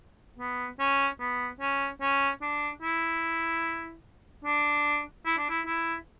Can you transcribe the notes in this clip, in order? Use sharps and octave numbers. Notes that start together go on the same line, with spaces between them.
B3
C#4
B3
C#4
C#4
D4
E4
D4
E4
D4
E4
E4